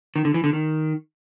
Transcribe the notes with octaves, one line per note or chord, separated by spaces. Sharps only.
D#3
D3
E3
D3
D#3